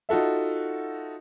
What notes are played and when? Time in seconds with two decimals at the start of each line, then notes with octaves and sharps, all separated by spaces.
0.09 D#4 F4 F#4 A4 E5